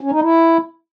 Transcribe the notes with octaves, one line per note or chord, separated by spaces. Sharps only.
C#4
D#4
E4